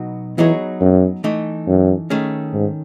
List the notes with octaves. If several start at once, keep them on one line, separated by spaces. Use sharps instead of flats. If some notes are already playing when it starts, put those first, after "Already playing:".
Already playing: B2 F#3 B3 D#4 F#4
E3 F#3 B3 D#4 G#4 C#5
F#2
E3 A3 D#4
F#2
D#3 A3 C#4 G#4
G#2